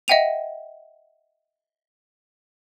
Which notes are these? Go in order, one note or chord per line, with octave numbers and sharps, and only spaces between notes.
D#5 E5 F#5 G5 D#7 F7